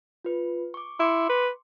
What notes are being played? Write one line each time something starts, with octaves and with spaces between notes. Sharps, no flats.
F4 B4
C#6 D6
E4 C6 D6 C#7
B4